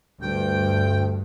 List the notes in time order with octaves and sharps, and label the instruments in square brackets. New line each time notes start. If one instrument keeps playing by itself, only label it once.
[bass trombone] D2 [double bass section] G2 [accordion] G5